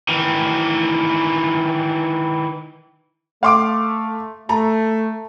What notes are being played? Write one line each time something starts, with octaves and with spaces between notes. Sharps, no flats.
D#3 E3
A3 F5 C6 D6
A3 A5 A#5